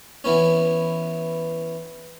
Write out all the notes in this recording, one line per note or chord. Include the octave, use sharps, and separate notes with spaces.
E3 B3 C#4